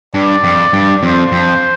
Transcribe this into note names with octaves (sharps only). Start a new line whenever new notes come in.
G2 D5
F2
G2
F2 C5
F2